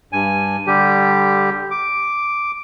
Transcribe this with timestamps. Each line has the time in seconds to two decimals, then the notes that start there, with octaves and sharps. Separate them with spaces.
0.13 G2 G#5
0.67 D3 G3 G4
1.71 D6